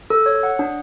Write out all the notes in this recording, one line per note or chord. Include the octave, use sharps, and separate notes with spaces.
A4
C#5
F#5
D4